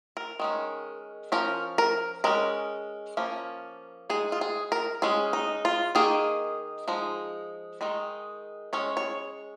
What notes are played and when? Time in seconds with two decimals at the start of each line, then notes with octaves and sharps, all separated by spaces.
0.17 A#4
0.40 D#3 G#3 C#4
1.32 F3 C#4 A#4
1.78 A#4
2.24 G#3 C#4 A#4
3.17 F3 A#3 C#4
4.10 G#3 D#4 G#4
4.32 F4
4.41 G#4
4.72 A#4
5.02 G#3 C#4 G#4
5.33 D#4
5.65 F4
5.95 D#3 A#3 D#4 G#4
6.88 F3 G#3 D#4
7.81 D#3 G#3 D#4
8.73 G#3 C#4 C#5
8.97 C#5